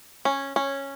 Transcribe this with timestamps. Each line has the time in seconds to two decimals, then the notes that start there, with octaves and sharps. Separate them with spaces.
0.25 C#4
0.56 C#4